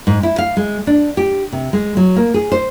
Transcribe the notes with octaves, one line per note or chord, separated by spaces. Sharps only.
G#2
E4
F5
G#3
D4
G4
C3
G#3
F#3
A#3
G#4
C5